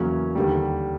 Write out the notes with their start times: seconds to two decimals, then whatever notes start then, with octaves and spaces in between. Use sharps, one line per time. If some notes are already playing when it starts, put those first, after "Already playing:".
Already playing: E2 C#3 F#3 A#3 C#4
0.35 D#2 D3 G3